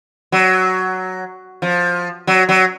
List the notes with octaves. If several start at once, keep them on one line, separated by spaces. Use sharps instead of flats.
F#3
F3
F#3
F#3